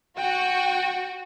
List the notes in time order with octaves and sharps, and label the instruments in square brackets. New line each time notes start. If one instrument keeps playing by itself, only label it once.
[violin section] F#4 [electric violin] G5